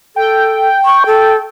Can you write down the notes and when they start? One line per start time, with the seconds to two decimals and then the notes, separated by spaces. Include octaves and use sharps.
0.16 A4 G5
0.85 C#6
1.06 A4